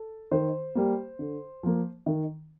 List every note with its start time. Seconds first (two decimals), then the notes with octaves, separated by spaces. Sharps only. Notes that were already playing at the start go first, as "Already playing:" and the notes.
Already playing: A4
0.31 D#3 C5
0.75 G3 A#3
1.19 D3
1.63 F3 A#3
2.06 D#3